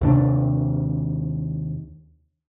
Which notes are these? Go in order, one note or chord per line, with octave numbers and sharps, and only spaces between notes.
D#2 C3 D4